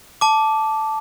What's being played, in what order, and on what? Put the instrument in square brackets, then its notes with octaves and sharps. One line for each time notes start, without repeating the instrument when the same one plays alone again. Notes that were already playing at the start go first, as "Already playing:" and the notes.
[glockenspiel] A5 D6